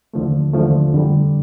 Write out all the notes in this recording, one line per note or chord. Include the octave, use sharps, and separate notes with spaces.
D#2 D3 F3 A3
D#2 D3 F3 A3
F2 D3 G3